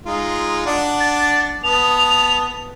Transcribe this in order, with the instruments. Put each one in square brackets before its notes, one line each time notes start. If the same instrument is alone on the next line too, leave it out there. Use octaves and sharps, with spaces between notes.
[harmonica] G#3 D#4 F4
D4 D5 F#5
[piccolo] A6
[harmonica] B3 A5 D#6 [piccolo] F7